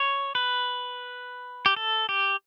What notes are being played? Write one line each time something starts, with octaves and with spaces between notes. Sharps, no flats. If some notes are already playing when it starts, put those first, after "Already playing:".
Already playing: C#5
B4
G4
A4
G4